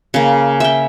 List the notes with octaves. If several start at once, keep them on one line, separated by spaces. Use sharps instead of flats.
C#3 A#3
E5 G5